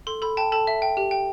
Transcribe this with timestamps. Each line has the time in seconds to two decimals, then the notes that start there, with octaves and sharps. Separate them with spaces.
0.07 A4 C6
0.22 A4 B5
0.37 G5 A5
0.52 A4 A5
0.67 E5
0.82 G5
0.97 G4
1.11 G5